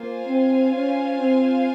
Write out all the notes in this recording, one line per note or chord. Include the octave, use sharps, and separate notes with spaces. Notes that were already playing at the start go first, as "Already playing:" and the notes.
Already playing: A#3 F4 C5 F5 G#5
C4
C#4
C4